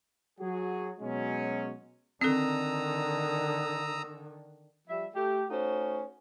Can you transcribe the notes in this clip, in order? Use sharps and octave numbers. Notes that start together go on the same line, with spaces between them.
F#3 F#4 G#4
B2 F#3 G#3 C#4
D3 D#3 C4 A4 A#5 D#6 E6
F3 G3 E5
A3 G4
A3 C#4 D#4 F#4 C5